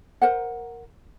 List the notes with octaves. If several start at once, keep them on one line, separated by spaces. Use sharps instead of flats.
A#4 C5 F#5